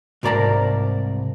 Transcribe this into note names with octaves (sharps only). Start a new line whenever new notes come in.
C2 G#2 A#4 D5 A5 A#5